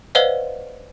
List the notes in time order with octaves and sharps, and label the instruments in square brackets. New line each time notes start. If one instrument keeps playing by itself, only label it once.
[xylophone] B4 C5 D5 D#5 F5 F#5